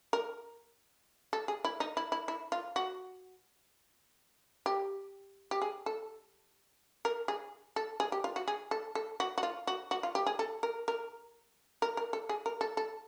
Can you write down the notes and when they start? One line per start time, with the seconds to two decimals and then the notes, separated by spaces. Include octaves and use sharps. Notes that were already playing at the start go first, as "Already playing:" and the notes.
0.13 A#4
1.33 A4
1.48 G#4
1.65 E4
1.80 D#4
1.97 E4
2.12 E4
2.28 E4
2.52 F4
2.76 F#4
4.66 G4
5.51 G4
5.62 G#4
5.86 A4
7.05 A#4
7.28 G#4
7.76 A4
8.00 G#4
8.12 G4
8.24 F4
8.36 F#4
8.48 G#4
8.71 A4
8.95 A4
9.20 F#4
9.38 F#4
9.43 F4
9.67 F#4
9.91 F#4
10.03 F4
10.15 G4
10.26 G#4
10.39 A4
10.63 A#4
10.88 A#4
11.82 A#4
11.97 A#4
12.13 A4
12.29 G#4
12.46 A#4
12.61 A4
12.77 A4